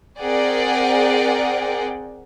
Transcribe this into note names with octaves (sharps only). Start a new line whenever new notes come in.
C4 G#4 A#4 D5 F#5 G5